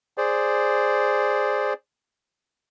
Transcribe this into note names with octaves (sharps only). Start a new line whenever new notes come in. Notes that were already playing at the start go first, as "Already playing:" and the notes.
G#4 C5 D5